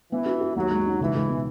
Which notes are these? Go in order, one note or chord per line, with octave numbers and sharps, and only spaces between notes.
E3 B3
F#4
F#4
D#2 F#3
G#3
D#4
C#2 E3
C#2
B2